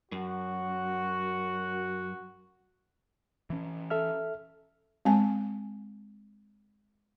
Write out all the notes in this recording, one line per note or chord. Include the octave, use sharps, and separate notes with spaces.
F#2 F#4
E3 C#4
A4 E5 F6
G#3 C4 G#5